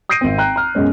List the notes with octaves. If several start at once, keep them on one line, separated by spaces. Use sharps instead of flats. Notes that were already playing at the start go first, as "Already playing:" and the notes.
D#6 G6 A#6 C7 D7 D#7
G#1 C4
G5 A#5 F#6
A#5 F6
F#2 B2 G#3 C#4